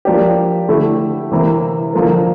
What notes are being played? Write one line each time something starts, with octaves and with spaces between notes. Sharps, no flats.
F3 A#3 D4 G4
D3 A3 E4 G4
C3 E3 A#3 E4
D3 F3 A#3 F4 A4